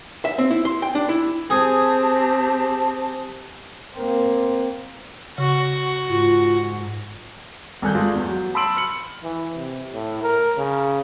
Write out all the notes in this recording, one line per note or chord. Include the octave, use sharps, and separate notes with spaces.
E5
C4
E4
C6
G5
D4
E4
C4 G4 G#4 A5
A#3 C4
C#3 F#4
G#2 F4
G#1 G2 A4 G#5 F#6 G6
G#3 A3 F4 D5
E2
F#3
A5 B5 C6 E6 D7 F#7
F6 C#7 F#7
E3
C3
A2
A#4
C#3